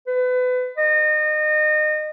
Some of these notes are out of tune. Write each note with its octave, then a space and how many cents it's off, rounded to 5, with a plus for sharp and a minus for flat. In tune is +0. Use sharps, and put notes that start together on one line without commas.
B4 +30
D#5 -30